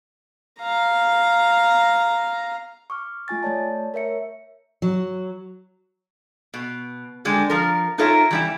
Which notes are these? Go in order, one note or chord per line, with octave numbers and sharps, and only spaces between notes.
F5 A#5
C#6 D6 F6
A3 F4 G#5 A6
A3 C#5 D5 A5
A#4 C#5 E5 C#7
F#3
B2
D3 G3 G#3
F3 A#4
D#4 F4 A4 A#4 C#5 E5
E3 G3 E4